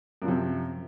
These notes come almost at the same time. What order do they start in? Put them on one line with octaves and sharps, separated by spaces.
F#2 F3 C3